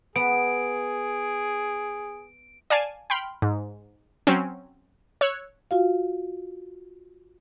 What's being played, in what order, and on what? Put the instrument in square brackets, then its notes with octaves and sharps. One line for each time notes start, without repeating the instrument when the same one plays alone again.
[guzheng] B3 [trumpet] G#4 [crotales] D7
[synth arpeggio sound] D5 F5 G#5 A5
G5 B5 C6 F6
G#2
F#3 C4 C#4
C#5 E6 F#6
[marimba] F4 F#4 F5